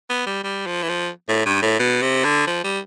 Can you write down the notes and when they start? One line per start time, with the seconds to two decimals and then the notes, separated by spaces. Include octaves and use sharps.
0.10 B3
0.26 G3
0.44 G3
0.66 F3
0.83 E3
0.89 F3
1.29 A2
1.46 G2
1.62 A2
1.79 B2
2.02 C3
2.24 D3
2.47 F3
2.64 G3